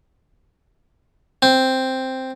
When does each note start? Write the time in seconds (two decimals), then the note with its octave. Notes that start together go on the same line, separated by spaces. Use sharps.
1.42 C4